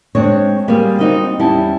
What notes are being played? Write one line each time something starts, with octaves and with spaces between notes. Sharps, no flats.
G#3 C4 D4 C#5
G3 A#3 C4 G4 G#4
G3 C4 D#4 F#4 A#4 D#5
E2 G3 C#4 E4 A5